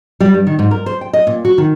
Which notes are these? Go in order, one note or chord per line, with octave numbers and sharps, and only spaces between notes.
G3
G2
D#3
G#2
A#4
C5
G5
D#5
A#2
F#4
D#3